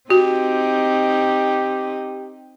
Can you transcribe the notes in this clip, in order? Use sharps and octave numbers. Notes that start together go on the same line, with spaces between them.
C4 D#4 F#4 G4